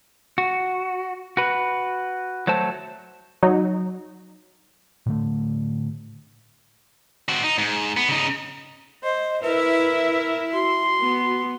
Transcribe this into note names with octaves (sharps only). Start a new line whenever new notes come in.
F#4
F#4 B4
F#3 A3 C5 A5
F#3 D#4
A2 D3 A3
C4 F#4
D#4
G#2
B3
C#3 D#4
C5 D#5
E4 A#4 B4 E5
F#4 C6
B3